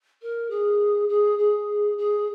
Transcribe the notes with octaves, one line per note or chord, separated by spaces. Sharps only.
A#4
G#4
G#4
G#4
G#4